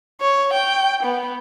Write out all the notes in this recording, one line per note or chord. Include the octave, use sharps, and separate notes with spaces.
C#5
G5
B3